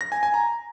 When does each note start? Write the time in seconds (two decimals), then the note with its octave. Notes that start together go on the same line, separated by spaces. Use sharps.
0.01 A#6
0.12 G#5
0.23 G#5
0.34 A#5